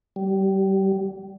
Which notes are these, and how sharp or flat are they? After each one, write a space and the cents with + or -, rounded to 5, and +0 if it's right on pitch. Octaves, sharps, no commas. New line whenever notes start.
G3 -25